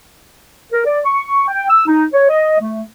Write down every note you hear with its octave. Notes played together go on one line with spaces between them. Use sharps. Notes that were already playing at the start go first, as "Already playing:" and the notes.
A#4
D5
C#6
G5
E6
D#4
C#5
D#5
A3